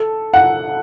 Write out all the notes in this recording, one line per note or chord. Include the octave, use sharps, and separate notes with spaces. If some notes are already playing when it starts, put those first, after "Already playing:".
Already playing: A4
F#5